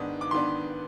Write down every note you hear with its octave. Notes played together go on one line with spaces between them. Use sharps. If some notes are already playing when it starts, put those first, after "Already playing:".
Already playing: G#2 D#3 B3 D4 D#6
D6
D#3 B3 D4 C6